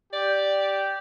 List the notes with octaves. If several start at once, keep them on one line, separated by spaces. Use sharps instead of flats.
G4 D5